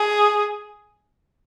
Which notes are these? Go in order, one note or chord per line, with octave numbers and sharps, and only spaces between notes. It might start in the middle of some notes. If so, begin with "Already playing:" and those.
Already playing: G#4